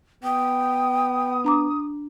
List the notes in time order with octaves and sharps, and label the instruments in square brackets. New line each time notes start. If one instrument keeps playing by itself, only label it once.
[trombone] B3 [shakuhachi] G5 [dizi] D#6
[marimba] D4 A#5 D6